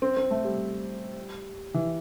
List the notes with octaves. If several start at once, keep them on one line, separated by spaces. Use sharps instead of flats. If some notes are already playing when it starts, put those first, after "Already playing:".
C4
C4
A3
G3
E3